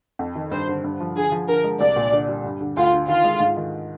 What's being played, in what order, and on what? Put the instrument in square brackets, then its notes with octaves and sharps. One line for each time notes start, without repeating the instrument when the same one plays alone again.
[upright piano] F2
D#3
[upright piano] G2 [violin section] C5
[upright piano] D3
G2
F3
[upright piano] D3 [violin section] G#4
[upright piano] F3
[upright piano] D3 [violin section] A#4
[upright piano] G#3
[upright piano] C2 [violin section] D5
[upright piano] A#2
D3
G3
G2
D3
[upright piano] D2 [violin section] F4
[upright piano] D3
[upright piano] D#3 [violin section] F4
[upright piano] G#3
G#2
D#3